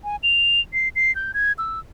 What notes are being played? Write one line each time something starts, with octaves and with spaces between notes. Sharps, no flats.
G#5
F7
C7
C7
G6
G#6
E6